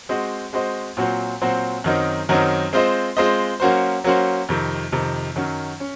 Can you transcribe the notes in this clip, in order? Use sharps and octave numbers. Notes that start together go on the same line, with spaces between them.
G#3 C4 F#4 C5 D#5
G#3 C4 F#4 C5 D#5
A#2 F#3 C4 F#4 C5
A#2 F#3 C4 F#4 C5
F#2 D#3 F#3 C4 D#4
F#2 D#3 F#3 C4 D#4
G#3 C4 F4 C5 D#5
G#3 C4 F4 C5 D#5
F#3 A#3 C#4 F#4 C5
F#3 A#3 C#4 F#4 C5
F2 C3 D#3
F2 C3 D#3
F#2 D#3 F#3 C#4
C#4